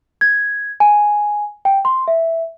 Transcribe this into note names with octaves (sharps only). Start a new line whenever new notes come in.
G#6
G#5
G5
C6
E5